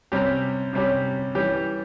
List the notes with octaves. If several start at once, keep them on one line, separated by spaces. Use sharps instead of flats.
C3 G3 C#4 G4
C3 G3 C#4 G4
E3 G3 C#4 G4